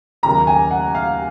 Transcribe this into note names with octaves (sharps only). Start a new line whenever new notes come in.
D#2 C#3 F#3 A#3 A#5
G#5
F#5
F5